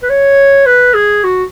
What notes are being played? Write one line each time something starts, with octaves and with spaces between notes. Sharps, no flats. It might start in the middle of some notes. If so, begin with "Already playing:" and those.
B4
C#5
B4
G#4
F#4